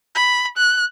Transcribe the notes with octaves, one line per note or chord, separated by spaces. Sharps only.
B5
F#6